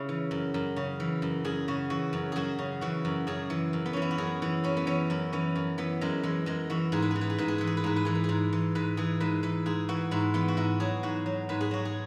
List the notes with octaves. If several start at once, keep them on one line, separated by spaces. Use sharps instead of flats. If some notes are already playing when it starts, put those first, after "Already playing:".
Already playing: C#3 E4
E3
F#2
F#2
C#3
E3
F#2
F#2 G#4
C#3 F#4
E3 F#4
F#2
F#2 F#4 G#4
C#3
E3 F#4
F#2
F#2 G#4
E3
F#2
B3
E3 C#4
E4
F#4
F#2 G#4
E3 E4
F#2 C#4
B3
E3 C#4
F#2 E4
E3 C#4
F#2
E3 B3
F#2 G#3
E3 G#3
F#2 G#3
E3 F#4
G#2 G#4
B4
E3 G#4
B4
G#4
G#2 B4
G#4
E3 B4
G#4
B4
G#2 G#4
B4
E3 G#4
B4
G#4
G#2
E3
G#2 B4
E3 G#4
G#2 B4
E3 B4
G#2 G#4
E3 F#4
G#2 E4
E3 B3
F#4
G#2 E4
F#3 G#4
G#2 F#4
F#3
G#2 B4
G#4
F#3 F#4
G#4